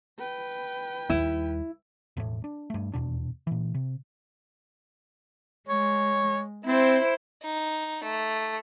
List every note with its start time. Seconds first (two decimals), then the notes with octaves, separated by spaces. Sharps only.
0.19 B4 G5
1.10 D#2 G3 E4
2.17 E1 A2 A3
2.44 D4
2.70 G2 A3
2.94 D#1 E2 B2 D4
3.47 A#2 E3
3.74 C3
5.69 G#3 C#5
6.66 C4 E4 C5
7.43 D#4
8.03 A3